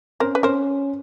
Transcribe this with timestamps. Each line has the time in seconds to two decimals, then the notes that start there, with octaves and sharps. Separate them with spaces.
0.20 C#4 A#4 C5
0.35 B4
0.43 C#4 A#4 C5